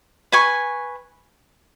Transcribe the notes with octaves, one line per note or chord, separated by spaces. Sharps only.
B4 G#5 C#6